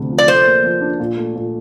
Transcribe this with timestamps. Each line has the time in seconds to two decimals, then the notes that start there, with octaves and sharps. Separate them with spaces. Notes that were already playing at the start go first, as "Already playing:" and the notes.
Already playing: D2 C3 A3
0.10 F3
0.18 D5
0.28 A4 C5
0.46 A#3
0.64 F3
0.81 D4
1.00 A#2
1.17 A3
1.36 A#2